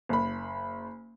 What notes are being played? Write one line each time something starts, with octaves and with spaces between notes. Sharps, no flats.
F#1 B5